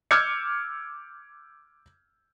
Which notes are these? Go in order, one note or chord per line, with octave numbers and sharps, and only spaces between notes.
D6 E6 F6 G6 G#6 C#7